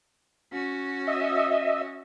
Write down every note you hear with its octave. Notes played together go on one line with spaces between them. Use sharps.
C#4 F#4
D#5 E5